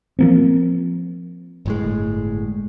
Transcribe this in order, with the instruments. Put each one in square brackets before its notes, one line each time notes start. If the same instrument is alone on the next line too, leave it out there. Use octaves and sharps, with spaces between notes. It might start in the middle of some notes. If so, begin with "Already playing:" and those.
[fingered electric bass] F3 A#3 C4
[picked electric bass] G1 A2 G#3